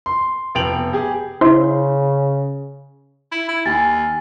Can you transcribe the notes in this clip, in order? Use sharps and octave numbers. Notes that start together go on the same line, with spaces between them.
C6
F1 B3 G5 D7 F7 F#7
G4 G#4
C#3 E4 C5 C6
E4
E4
D#2 G#5 A6